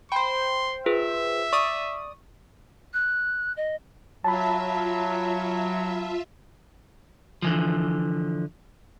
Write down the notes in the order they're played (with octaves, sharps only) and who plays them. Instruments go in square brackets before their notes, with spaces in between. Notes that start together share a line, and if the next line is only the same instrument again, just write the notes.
[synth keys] C5 G5 [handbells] B5 [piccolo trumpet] C6
[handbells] F4 G#4 B4 [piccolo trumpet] E5
[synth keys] D5 D#6 [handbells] C#6
[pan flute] F#6
D#5
[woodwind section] F#3 [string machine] F4 E5 [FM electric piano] A5 B5
[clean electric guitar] D3 E3 F3